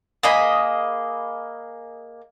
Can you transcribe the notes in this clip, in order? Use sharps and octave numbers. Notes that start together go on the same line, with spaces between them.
A#3 G#4 D#5 B5